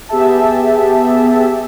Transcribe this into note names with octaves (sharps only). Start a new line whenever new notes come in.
B3 G4 G#4 E5 A5